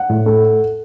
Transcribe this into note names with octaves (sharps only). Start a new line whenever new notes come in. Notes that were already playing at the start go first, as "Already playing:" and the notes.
Already playing: F#5
A2
A3